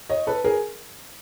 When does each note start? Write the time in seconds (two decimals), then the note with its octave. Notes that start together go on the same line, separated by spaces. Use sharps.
0.10 C#5 D#5
0.27 A4 B4
0.44 G#4 A#4